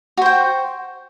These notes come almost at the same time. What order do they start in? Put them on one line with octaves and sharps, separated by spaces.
F#4 C5 G5